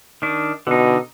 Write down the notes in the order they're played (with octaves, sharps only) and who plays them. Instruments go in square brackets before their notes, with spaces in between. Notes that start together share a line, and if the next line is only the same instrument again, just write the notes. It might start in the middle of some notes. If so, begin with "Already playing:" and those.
[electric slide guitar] D#3 D4
[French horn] B2 [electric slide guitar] D3 D#4